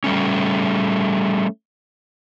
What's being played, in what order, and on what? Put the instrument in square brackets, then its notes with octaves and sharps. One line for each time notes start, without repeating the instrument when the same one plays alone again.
[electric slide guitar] G3 A3 C#4